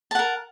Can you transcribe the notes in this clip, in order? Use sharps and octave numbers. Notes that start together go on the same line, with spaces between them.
A#4 F#5 A5